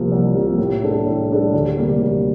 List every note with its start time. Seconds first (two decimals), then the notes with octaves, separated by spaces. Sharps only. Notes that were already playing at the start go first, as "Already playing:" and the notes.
Already playing: C2 C3 F3 A#3
0.12 C2
0.35 C3 F3 A#3
0.58 A2
0.83 G3 D4 A4
1.06 A2
1.30 G3 D4 A4
1.53 D2
1.77 C3 G3 A#3
2.02 D2